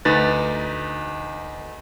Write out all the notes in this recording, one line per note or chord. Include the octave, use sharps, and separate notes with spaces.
D2 D#4 B4 A6